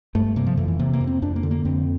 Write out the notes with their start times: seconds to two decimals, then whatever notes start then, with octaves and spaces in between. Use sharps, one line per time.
0.15 G2 A3
0.36 C3 A#3
0.47 F3
0.57 F2 E3
0.68 E3
0.79 C3 A#3
0.93 A#3
1.01 F2
1.07 C4
1.22 F2 D4
1.36 A#3
1.43 D3
1.51 A#3
1.65 F2 C4